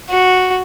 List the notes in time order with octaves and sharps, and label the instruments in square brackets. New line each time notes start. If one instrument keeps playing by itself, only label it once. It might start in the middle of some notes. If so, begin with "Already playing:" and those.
[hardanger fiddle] F#4